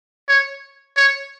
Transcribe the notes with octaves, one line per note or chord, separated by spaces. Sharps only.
C#5
C#5